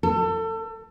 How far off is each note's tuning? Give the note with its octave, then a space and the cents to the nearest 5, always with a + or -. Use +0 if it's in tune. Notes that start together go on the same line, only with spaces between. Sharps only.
A4 +30